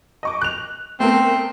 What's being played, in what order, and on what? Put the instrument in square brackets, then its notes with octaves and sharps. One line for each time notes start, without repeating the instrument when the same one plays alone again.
[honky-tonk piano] D#5 C#6 D6
F#6 F7
[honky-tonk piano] A3 B3 A#4 [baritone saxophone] C4